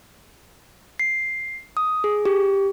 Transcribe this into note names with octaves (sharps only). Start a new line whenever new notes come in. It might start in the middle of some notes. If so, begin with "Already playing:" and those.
C7
D#6
G#4
G4